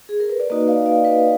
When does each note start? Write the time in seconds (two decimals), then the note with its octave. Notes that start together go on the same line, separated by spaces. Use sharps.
0.09 G#4
0.20 A#4
0.30 B4
0.40 D5
0.50 A#3 D#4 F#4 B4 D#5
0.68 D5 F5
0.86 D5 F5
1.04 B4 D#5